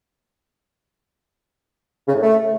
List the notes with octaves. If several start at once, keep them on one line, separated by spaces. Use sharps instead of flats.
C#3
A2
A3